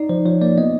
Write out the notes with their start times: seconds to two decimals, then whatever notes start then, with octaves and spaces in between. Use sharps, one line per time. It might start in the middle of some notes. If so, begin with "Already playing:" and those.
Already playing: D#4 D5
0.09 F3 C5
0.25 F3 C#5
0.42 A#3 D5
0.58 B3 D#5